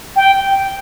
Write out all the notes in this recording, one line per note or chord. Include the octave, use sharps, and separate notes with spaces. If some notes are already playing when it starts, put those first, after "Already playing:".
G5